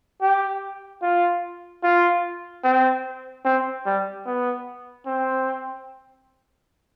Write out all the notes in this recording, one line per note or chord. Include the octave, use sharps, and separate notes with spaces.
G4
F4
F4
C4
C4
G3
B3
C4